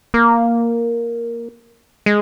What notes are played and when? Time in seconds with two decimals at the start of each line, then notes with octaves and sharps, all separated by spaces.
0.14 A#3
2.06 G#3